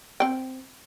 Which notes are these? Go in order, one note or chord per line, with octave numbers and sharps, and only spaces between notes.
C4 G5